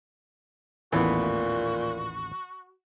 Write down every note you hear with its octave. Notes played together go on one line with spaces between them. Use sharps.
A1 D#2 A#2 E3 A3 B3 F#4